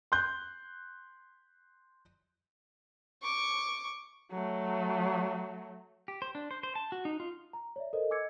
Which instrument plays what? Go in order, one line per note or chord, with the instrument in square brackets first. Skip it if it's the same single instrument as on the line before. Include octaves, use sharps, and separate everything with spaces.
[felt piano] C6 F#6 G6
[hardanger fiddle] C#6 D6
[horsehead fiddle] F#3 A3
[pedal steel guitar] G4
C5
D4
C5
C5
A5
F#4
D#4
F4
[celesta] A#5
C#5 D5 E5
A4 A#4 C5 D#5
D#5 G#5 D6 E6 G#6 C#7